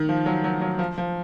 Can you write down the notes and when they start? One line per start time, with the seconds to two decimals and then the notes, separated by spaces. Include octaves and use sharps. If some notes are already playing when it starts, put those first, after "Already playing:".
Already playing: D#3
0.09 F3
0.26 F#3
0.44 F#3
0.62 F#3
0.79 F3
0.98 F3